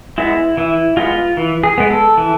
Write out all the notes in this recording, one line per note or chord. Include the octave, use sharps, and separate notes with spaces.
G#3 B3 E4
E3 E4
G#3 B3 F4
E3
G#4
G#3 B3
A4
E3